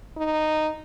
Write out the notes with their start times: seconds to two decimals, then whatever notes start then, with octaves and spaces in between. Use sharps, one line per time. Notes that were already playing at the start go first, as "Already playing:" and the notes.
0.17 D#4